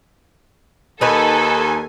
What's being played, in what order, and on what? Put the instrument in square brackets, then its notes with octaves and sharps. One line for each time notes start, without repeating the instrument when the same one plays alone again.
[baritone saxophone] D#2 [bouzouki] D#4 B4 [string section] A4 [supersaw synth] G#5